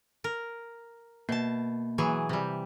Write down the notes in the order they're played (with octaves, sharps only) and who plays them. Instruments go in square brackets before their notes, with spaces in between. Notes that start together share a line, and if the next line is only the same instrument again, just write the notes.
[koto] A#4
[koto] B2 A5 [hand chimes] A#3
[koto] E3 F#3 G#4
C3 G3